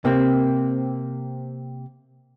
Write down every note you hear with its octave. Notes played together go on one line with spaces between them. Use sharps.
C3 A#3 C4